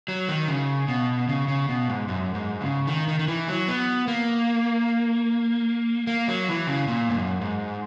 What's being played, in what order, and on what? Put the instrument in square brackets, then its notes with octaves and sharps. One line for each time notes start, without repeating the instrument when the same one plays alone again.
[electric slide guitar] F#3
D#3
C#3
B2
C#3
C#3
B2
G#2
F#2
G#2
C#3
D#3
D#3
D#3
E3
F#3
B3
A#3
A#3
F#3
E3
C#3
A#2
G#2
F#2
G#2